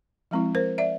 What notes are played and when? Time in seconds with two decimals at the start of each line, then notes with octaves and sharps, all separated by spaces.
0.31 F3 G#3 C4 E4
0.55 A#4 C5
0.78 D5 E5